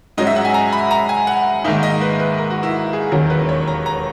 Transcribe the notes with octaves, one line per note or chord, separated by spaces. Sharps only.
G#2 F#3 C#4 D#5
E5
F#5
G#5
A#5
B5
A#5
G#5
F#5
G#2 D#3 A#3 D#4 E5
D#5
B4
B4
A#4
F#4
E4
G#4
E1 D#2 D#3 F#3 C#4 A#4
B4
C#5
A#5
A#5